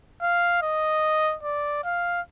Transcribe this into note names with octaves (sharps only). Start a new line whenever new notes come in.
F5
D#5
D5
F5